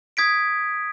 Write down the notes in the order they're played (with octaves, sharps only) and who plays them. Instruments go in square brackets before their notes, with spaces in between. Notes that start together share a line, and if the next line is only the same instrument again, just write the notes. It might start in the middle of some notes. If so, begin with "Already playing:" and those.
[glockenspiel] D#6 G#6 B6 D7